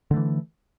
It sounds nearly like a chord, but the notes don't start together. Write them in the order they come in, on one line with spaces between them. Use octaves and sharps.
D3 A3 E3